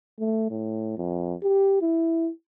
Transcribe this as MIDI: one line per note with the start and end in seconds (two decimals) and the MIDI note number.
0.20 0.50 57
0.50 0.93 45
0.97 1.34 41
1.43 1.79 67
1.81 2.30 64